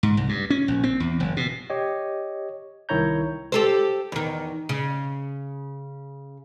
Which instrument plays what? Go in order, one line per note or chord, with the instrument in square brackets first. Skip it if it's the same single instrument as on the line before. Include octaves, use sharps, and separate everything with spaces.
[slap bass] G#2
C2
G2
C#4
A#1
C4
E2
F#1
B2
[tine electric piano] G4 C#5 D#5
C2 D#3 E4 C#5 A#5 G6
[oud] G4 A4 C5
E2 D#3
C#3